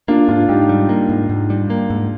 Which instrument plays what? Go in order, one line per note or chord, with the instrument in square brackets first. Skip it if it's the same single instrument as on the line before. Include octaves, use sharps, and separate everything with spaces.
[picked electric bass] A#3 [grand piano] D4 F4
[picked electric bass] G#2 [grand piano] D4 F4
[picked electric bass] G#2 [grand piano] D#4 G4
[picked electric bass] G3
A#3
G#2
G#2
G3
A#3
G#2